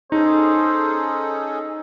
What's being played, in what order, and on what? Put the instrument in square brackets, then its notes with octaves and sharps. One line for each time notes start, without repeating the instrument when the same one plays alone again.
[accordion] C#4 G#4 A4 [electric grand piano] D#4 [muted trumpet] C5